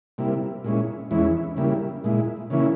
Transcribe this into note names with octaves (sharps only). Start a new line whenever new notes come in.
C3 G3 A#3 E4
A#2 G#3 C#4 E4
E2 E3 G#3 C#4 E4
C#3 G3 A#3 E4
A#2 G#3 E4
C#3 E3 A#3 C#4 E4